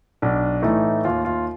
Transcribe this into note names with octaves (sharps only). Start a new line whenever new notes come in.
B1 D4
A2 E3 A3 D#4
D#2 F4
F4